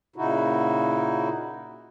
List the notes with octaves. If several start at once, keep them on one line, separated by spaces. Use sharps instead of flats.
A#2 C#3 D#4 E4 F#4